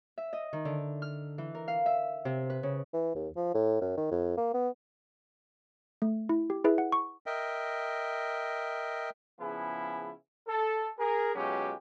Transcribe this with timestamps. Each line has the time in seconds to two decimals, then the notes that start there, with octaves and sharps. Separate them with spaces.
0.18 E5
0.33 D#5
0.53 D#3
0.65 D3
1.02 F6
1.38 E3
1.55 A#4
1.68 F5
1.86 E5
2.25 C3
2.50 B4
2.63 C#3
2.94 E3
3.15 D#2
3.36 F3
3.54 A2
3.81 F#2
3.97 D#3
4.12 F2
4.38 A#3
4.54 B3
6.02 A3
6.29 E4
6.50 G4
6.64 E4 G#4 B4 E5
6.78 F#5
6.92 C#6
7.26 A#4 D#5 E5 G5
9.40 C#3 F3 B3 E4 G#4
10.47 A4
10.98 G#4 A#4
11.35 B2 F#3 G#3 C#4 F4 G4